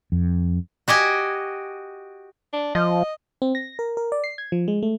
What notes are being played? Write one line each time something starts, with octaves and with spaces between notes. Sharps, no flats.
F2
F#4 G4 D#5 G#5
D4
F3 D#5
C4
A#6
A#4
A#4
D5
C7
G#6
F3
G#3
A3